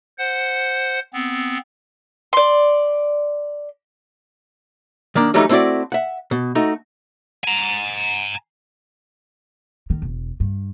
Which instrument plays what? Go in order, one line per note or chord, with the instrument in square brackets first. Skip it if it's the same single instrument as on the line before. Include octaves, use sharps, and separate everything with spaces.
[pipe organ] C5 F#5
B3 C4
[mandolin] D5 C6
[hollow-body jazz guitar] D#3 A#3 D4
E3 F#3 G3 A3 D#4
A3 C4 E4 F#4 D5
E5 F#5
B2
A3 D#4 F#4
[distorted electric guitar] G#5 A#5
[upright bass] D#3
E1
G2